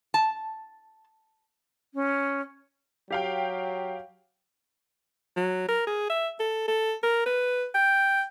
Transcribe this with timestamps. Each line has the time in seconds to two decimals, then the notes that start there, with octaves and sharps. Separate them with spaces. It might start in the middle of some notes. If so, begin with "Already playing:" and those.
0.14 A5
1.94 C#4
3.11 F#3 G4 F5 G5
5.37 F#3
5.69 A#4
5.87 G#4
6.10 E5
6.40 A4
6.68 A4
7.03 A#4
7.26 B4
7.75 G5